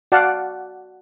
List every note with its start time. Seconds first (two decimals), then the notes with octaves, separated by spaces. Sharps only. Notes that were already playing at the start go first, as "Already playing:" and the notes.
0.12 F#4 D5 F5 F#5 A5